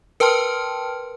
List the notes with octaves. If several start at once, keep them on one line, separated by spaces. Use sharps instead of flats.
A#4 B4 G5 A5 C6 F6